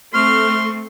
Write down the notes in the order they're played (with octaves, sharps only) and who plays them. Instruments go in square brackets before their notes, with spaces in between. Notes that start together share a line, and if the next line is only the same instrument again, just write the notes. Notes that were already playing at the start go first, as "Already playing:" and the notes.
[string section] A3 C4 [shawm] C6 [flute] C#6 [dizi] F6